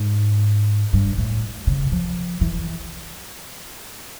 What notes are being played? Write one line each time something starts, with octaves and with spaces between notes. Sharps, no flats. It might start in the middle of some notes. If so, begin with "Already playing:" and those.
Already playing: G#2
G2
A2
C#3
F3
E3